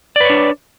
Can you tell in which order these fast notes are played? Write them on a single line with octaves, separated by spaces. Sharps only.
D5 B4 C#5 D4